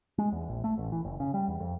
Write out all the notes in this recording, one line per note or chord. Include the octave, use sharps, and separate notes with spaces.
G#3
E2
A#1
A3
A1
E3
F#1
C#3
G3
E2
F2